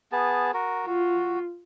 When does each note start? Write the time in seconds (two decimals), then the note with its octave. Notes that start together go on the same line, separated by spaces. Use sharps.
0.12 B3 G#4 A5
0.54 F#4 A#4
0.87 F4 F#4